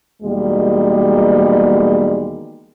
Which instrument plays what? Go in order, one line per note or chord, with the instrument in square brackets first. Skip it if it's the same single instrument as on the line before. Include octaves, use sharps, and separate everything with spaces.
[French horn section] E2 B2 D#3 G3 G#3 A#3